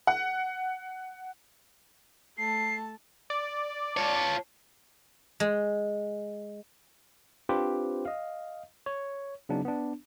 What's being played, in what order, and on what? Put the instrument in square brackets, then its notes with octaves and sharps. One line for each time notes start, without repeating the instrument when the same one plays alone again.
[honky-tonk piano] F#5
[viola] A3 A5 [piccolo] C7
[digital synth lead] D5
[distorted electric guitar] F4 C#5 [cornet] A5
[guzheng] G#3
[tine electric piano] C4 D4 F4 G4 B4 C5
D#5 F5
C#5
C#3 F#3 B3 D4 D#4
B3 D4